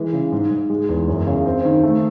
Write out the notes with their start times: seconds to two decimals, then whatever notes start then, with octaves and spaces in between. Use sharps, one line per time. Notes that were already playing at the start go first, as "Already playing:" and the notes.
Already playing: E3 G#3
0.13 C#3
0.32 G#2
0.51 G#2
0.70 G#3
0.89 E2
1.08 F#2
1.27 C#3
1.46 C4
1.65 D#3
1.83 A3